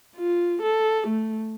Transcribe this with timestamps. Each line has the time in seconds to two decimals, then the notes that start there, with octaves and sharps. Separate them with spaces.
0.16 F4
0.62 A4
1.07 A3